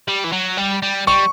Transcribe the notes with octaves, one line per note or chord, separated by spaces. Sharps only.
G3
E3
F#3
G3
G3
G3 C#6